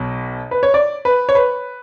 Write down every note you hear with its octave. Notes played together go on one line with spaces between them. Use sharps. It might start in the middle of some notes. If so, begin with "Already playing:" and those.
Already playing: B1 B2
B4
C#5
D5
B4
C#5
B4